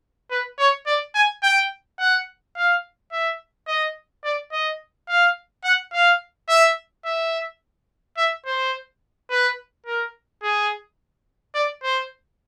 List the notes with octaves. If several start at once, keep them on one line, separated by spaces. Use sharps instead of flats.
B4
C#5
D5
G#5
G5
F#5
F5
E5
D#5
D5
D#5
F5
F#5
F5
E5
E5
E5
C5
B4
A#4
G#4
D5
C5